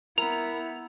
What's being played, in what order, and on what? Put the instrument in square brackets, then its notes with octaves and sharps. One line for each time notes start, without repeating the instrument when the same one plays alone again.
[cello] B3 [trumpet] E4 [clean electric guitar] A#4 [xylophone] F7